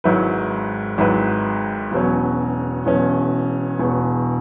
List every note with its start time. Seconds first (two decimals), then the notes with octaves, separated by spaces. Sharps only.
0.04 G#1 G#2 F#3 E4 B4
0.98 G#1 G#2 F#3 E4 B4
1.92 E1 E2 B2 F#3 C#4
2.86 E1 E2 B2 F#3 C#4
3.79 E1 E2 B2